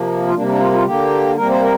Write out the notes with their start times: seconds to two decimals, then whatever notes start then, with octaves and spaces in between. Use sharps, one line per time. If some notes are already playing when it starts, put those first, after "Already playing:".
Already playing: C3 F3 A#3
0.27 F4
0.34 C3 G3 A#3 D4
0.47 D4
0.60 F4
0.72 F4
0.85 D3 A#3 G4
1.37 C3 G3 A#3 A#4
1.50 C5
1.61 A#4